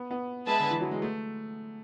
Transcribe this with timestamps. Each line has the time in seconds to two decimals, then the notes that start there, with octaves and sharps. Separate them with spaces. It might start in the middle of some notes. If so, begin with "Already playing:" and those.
Already playing: B3
0.11 B3
0.47 G#3 G#4 B4 E5 A5
0.60 D3
0.70 E3
0.81 F#3
0.91 G#3
1.02 A3